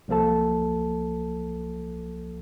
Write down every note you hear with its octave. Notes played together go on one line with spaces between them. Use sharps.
C2 F3 A#3 A4 A5